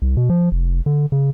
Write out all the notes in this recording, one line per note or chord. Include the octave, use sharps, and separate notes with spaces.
C2
B2
F3
F1
D3
C#3